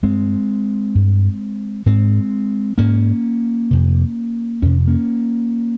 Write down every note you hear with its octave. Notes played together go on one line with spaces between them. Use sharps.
G2 G#3 C4
G2
G#2 G#3 C4
G#2 A#3 C#4
F2 C3
F2 C3 C#4
A#3 C#4